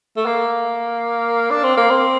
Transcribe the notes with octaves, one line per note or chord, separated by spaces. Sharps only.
A3
A#3
D4
C4
A#3
C4